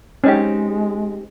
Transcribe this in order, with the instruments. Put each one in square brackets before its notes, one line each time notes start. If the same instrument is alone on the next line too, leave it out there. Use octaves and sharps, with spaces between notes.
[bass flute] G#3 [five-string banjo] C4 D#4 G4 [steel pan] C#4